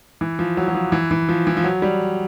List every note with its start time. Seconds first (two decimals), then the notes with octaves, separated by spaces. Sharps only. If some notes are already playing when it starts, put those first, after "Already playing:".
0.21 E3
0.39 F3
0.57 F#3
0.68 F#3
0.74 F3
0.92 E3
1.11 E3
1.29 F3
1.47 E3
1.57 F3
1.64 F#3
1.82 G3